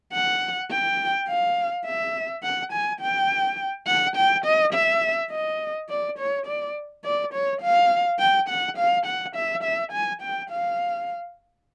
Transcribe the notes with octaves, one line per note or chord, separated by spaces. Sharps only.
F#5
G5
F5
E5
F#5
G#5
G5
F#5
G5
D#5
E5
D#5
D5
C#5
D5
D5
C#5
F5
G5
F#5
F5
F#5
E5
E5
G#5
G5
F5